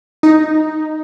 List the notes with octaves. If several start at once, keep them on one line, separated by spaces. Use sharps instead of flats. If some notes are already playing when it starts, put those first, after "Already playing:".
D#4